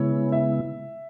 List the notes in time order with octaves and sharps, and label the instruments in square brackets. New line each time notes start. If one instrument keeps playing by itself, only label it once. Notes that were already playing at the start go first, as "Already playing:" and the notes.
Already playing: [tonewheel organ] C#3 G#3 B3 E4 [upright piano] C#5
[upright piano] E5